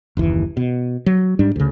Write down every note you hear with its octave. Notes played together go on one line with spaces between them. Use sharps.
F#1 D#2 E3
B2
F#3
G#2 G3 D4
D2 C#3